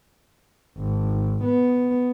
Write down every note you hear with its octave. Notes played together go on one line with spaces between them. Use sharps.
G#1
B3